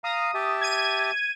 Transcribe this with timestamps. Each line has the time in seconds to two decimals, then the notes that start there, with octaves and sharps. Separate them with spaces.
0.04 F5 A#5 D#6
0.34 G4 E5 A5
0.61 G#6 D#7